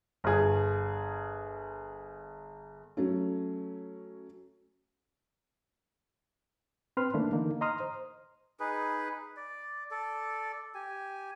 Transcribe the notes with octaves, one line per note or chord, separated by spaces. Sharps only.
G1 G#4
F#3 A3 C#4
C4 B4 C6 F6
D#3 A3 A#3 D4
D3 E3 A#3 D#4
D#5 A#5 C6 D#6 F6
C5
D#4 G#4 B4
D5
A4 D5
G4 G#5